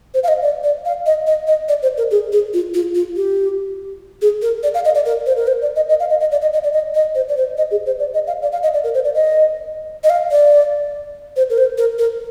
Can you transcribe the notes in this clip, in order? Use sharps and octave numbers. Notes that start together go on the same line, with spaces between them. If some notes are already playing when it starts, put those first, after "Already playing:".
C5
F5
D#5
D5
D5
F5
D#5
D#5
D#5
D5
C5
A#4
G#4
G#4
F4
F4
F4
G4
G#4
A#4
D5
F5
D#5
D5
A#4
C5
A#4
C5
D5
D#5
D#5
F5
D#5
D#5
D5
D#5
D#5
D5
D#5
D#5
C5
D5
C5
D#5
G#4
C5
D5
D#5
F5
D5
F5
D#5
D5
A#4
C5
D5
D#5
D#5
F5
D5
C5
A#4
C5
A#4
A#4